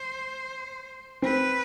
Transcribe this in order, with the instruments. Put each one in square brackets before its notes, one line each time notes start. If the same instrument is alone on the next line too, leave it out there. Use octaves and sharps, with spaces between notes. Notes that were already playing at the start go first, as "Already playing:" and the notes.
Already playing: [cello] C5
[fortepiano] C4 [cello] B4